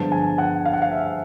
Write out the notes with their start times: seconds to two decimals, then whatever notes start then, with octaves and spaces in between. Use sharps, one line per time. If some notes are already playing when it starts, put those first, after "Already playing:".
Already playing: G2 D3 F3 G#3 B3 A5
0.12 G#5
0.38 F#5
0.66 F5
0.73 F#5
0.82 F5
0.91 E5